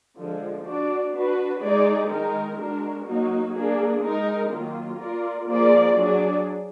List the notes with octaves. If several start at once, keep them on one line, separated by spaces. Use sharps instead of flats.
D3 F3 G#3
D4 F#4 D5
D4 F#4 B4
G#3 D#4 G#4 D5
D#3 G#3 D#4 A#4
G#3 D4 F#4 A#4
F#3 A#3 D#4 F#4
A#3 D4 G#4
G#3 D#4 A#4
D#3 F#3 A#3 F4
A#3 F4 A#4 D5
F3 A#3 F4 G#4 D5
F#3 D4 G#4 D5